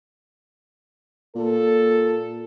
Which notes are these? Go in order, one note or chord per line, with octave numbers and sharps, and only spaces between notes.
A#2 A4